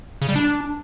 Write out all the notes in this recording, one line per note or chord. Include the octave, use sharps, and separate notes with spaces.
C#3
G3
D4